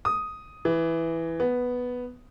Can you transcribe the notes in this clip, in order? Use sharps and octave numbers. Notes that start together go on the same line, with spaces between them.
D#6
E3
B3